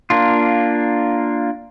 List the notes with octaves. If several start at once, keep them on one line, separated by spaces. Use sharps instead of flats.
A#3 D4 F4